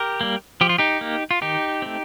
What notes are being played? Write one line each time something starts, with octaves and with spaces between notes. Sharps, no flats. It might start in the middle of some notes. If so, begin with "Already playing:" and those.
Already playing: G4 A#4
G3 A#3
F3 G4
F4
D#4 G4
A#3
F4
D#3 D#4 G4
A3 C4